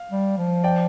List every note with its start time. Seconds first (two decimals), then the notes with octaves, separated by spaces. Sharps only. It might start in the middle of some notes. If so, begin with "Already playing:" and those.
Already playing: F5
0.11 G3
0.38 F3
0.64 D5 G5